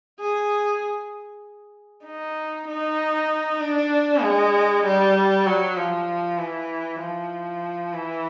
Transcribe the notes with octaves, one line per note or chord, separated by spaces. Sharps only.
G#4
D#4
D#4
D4
G#3
G3
F#3
F3
E3
F3
E3